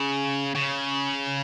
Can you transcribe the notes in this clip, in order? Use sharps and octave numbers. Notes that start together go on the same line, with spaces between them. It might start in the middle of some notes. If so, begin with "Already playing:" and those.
Already playing: C#3
C#3